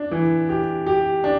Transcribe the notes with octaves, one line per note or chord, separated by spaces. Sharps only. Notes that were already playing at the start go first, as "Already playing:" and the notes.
Already playing: D4
E3
G4
G4
D4